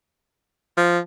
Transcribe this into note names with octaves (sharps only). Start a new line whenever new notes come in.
F3